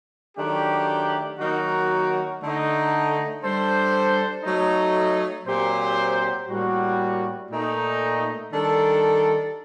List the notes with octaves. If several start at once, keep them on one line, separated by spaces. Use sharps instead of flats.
D#3 F#3 A3 D4 G4
D#3 F#3 A#3 D#4 F#4
D3 A3 D#4
G3 D4 A4 C5
F#3 A3 D#4
A#2 F#3 C4 G4 C5
A2 G3 A#3 F#4
A#2 A3 D#4
D#3 G3 D4 A4